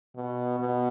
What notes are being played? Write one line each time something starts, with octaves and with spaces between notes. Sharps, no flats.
B2
B2